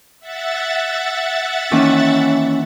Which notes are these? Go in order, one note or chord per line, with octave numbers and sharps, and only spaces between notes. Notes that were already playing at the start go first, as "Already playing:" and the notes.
E5 F#5 A6
D#3 E3 A#3 C#4